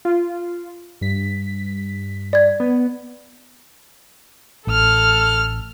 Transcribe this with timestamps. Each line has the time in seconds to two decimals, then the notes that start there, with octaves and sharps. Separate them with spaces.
0.05 F4
1.01 G2 B6
2.33 D5 G#6
2.60 B3
4.67 A1 A4 F6